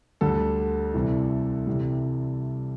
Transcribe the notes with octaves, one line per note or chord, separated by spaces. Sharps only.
D2 D3 G3 A4
C2 C3 E3
C2 C3 E3 G3